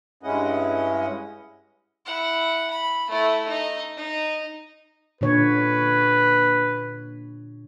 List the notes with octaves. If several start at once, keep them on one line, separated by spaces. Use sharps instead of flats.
G2 G#3 C#4 E4 D#5 F#5
E4 F#5
B5
A3 E4
D#4
D#4
A#2 D3 B4 C#5